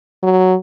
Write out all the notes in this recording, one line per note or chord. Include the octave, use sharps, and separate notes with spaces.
F#3